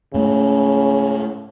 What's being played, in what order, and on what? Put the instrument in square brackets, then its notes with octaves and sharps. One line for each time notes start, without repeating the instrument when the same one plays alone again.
[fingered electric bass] G#2 A3 [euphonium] C#3